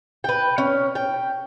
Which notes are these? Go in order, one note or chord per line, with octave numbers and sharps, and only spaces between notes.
B4 G5
C#4
G5